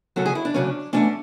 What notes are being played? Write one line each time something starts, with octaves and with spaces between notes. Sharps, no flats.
D2 C#3 F#3 C#4 A4
G#4
E4
D4
D2 C#3 F#3 C#4
E2 B2 A3 C#4 D4